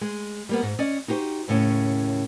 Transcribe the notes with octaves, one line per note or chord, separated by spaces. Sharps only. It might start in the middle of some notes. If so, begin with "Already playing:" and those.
G#3
G3 A#3 B3
G#2
C#4 D5 D#5
D#4 F#4 G4 C5
D#2 A2 C#3 C#4